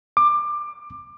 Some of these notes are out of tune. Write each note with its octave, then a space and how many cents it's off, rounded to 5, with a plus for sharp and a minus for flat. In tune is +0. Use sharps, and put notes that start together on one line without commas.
D6 +20